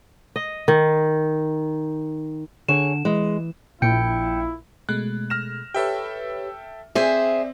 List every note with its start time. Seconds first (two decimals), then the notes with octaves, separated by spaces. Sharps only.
0.36 D#5
0.68 D#3
2.68 D3 G#4 C#5 E7
3.05 E3 G#3
3.82 A#1 A#2 E4 G5 C#7
4.89 B2 G#3 A3 F#6
5.30 F6 A#6 E7
5.74 G4 A4 B4 C#5 E5 G5
6.95 C4 G#4 C5 D5 E5